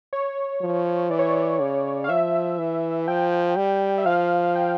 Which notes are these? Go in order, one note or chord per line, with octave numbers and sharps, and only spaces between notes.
C#5
F3
E3 D5
C#5
D5
C#3
F5
F3 E5
E3
F3 G5
G3
E5
F3 F5
G5